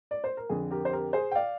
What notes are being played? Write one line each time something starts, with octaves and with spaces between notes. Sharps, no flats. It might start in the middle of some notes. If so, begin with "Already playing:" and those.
D5
C5
A#4
F2 D3 G#4
G4 A#4
C5
G4 A#4
G#4 C5
G5
D5 F5